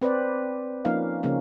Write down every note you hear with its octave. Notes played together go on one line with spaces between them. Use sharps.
C4 B4 C5 D5
F3 A#3 C#4 D#4 F5
C#3 F3 A#3 C#4